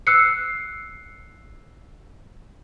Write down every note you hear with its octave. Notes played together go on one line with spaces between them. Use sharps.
E6 F#6 C7 C#7